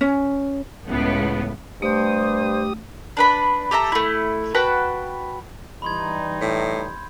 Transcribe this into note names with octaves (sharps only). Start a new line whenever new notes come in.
C#4
C#2 A2 C#3 B3
G2 A3 G4 C5 D#6
D4 B4 B5
G4 A4 E5 A#5
A3 E4
F#4 B4 G5 A5
E3 G3 D#4 B5 C6 G#6
A2 G6